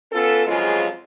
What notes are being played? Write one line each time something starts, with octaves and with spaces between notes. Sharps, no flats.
B3 C#4 F4 A4
F2 C#3 F3 F#3 G#3 F4